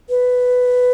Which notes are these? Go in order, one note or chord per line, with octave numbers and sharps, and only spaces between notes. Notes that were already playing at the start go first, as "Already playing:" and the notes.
B4